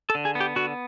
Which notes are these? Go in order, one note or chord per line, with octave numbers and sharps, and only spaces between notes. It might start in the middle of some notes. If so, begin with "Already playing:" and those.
A4
D3
G#4
B3
G4
D3 F#4